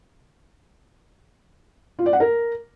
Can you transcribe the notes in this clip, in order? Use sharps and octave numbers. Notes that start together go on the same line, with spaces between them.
F4
D5
F#5
A#4